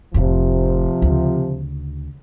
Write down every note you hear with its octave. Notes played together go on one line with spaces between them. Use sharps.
F1 A2 C3 F3
D2 C#3